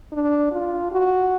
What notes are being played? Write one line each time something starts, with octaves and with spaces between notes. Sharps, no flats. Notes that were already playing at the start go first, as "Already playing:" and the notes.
D4
F4
F#4